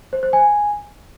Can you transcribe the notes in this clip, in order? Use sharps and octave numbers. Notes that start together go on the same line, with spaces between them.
C5
C5
G#5